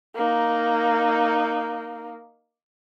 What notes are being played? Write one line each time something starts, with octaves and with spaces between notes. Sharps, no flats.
A#3 D#4